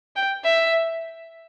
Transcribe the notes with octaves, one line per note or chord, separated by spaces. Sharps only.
G5
E5